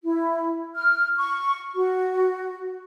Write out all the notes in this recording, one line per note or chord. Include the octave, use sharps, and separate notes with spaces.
E4
F6
C#6
F#4